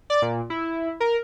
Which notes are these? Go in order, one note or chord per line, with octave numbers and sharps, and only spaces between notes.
D5
A#2
E4
A#4